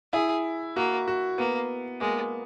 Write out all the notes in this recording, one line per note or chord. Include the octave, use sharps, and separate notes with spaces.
E4 G#4
A#3 F#4
F#4
A#3 B3
G#3 A#3